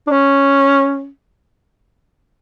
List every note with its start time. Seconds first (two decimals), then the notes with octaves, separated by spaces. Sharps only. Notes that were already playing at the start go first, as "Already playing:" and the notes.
0.07 D4
0.11 C#4